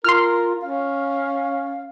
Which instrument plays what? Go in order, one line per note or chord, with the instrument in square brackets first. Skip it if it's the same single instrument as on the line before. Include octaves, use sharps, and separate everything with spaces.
[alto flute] F4 [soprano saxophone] A#4 [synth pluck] C6 F6
[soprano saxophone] C#4 [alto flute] F5